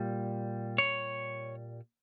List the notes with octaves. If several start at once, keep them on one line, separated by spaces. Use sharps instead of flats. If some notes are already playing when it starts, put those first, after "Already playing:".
Already playing: A#2 G3
C#5